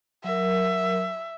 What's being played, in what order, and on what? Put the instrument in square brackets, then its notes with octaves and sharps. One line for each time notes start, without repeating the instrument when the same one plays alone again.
[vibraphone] F#3 A#4 [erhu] E5